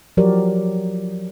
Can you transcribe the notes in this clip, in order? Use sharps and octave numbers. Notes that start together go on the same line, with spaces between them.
F3 F#3 F#4 G4 A#4 D5